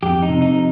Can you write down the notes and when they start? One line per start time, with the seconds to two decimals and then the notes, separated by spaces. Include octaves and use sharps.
0.03 F2 G4
0.22 D#4
0.29 C3
0.42 D#4
0.54 F3